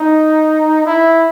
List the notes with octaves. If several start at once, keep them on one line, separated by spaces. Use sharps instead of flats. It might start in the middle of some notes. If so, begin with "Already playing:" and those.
Already playing: D#4
E4